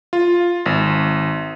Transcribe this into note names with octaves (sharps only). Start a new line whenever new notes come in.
F4
G#1